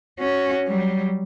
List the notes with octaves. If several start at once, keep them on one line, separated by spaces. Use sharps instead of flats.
C#4 F#4
F#3 G3